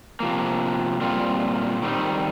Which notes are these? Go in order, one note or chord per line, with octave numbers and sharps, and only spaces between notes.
C3 F3 A#3
A#2 G3 C4 F4
D#3 G3 C4 D#4